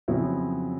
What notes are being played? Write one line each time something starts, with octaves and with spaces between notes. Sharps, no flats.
F2 C#3 F#3 B3 E4